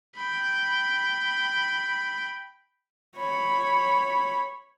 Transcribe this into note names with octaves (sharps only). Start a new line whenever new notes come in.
G5 B5
C#5 B5